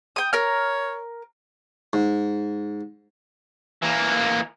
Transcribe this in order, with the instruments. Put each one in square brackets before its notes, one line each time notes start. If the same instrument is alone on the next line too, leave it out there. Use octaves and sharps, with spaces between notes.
[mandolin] G5 D#6
[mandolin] A#4 F6 [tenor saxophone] C#5
[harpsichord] G#2
[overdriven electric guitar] E3 A#3